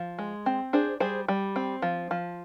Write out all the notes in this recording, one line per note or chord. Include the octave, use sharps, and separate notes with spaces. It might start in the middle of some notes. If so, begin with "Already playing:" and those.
Already playing: F3
G#3
C4
D4 G#4 C5
G3 G#4 C5
G3
C4
F3
F3